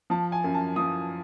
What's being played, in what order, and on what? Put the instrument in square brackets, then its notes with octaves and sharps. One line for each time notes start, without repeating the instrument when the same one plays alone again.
[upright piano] F3 A5
G#5
F#2
A5
F3 D#6